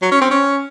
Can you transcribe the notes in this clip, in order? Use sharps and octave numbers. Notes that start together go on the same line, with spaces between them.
F#3
C#4
C4
C#4